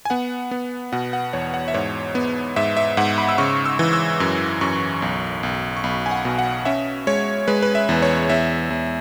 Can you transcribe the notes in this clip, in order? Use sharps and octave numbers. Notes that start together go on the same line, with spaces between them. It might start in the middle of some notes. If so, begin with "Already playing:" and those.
G#5
B3 F#5
B3
B2 F#5
F#5
E2 C#5
F#5
E5
G#2 C#5
B3
G#2 E5
E5
G#2 F#5
B5
E6
C#3 C#6
E6
E3
E6
F#2 E6
F#2 C#6
B1
B1
C#6
B1 B5
G#5
F#5
B2
F#5
C#4 E5
G#3 C#5
G#3 B4
B4
E5
E2
C#5
E2 E5
E2